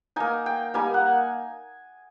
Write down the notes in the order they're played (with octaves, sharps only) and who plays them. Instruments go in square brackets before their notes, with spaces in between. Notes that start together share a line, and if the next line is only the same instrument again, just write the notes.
[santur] A#3 D#4 G#5
G5
G3 A#3 D#4 G#5
F#5